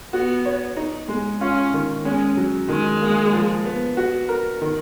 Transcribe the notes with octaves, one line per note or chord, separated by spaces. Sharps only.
B3 F#4
C#5
D#4
G#3
C#4 F4
D#3
G#3 C#4
F#3
D#3 G#3
A#3
F3
B3
F#4
A#4
D#3